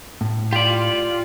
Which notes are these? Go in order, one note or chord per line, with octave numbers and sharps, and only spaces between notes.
A2
F4 G4 D5